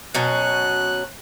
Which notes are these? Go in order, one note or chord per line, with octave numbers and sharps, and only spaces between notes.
B2 F#3 C#4 F#6